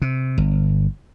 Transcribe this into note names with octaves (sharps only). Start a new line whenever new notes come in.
C3
G1